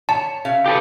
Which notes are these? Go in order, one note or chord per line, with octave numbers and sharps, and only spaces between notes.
C#5 A5
C#3 E5 F5
G4 A4 B4